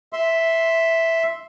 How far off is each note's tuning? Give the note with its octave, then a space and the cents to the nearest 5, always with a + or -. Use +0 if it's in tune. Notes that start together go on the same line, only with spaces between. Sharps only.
E5 +0 C6 +0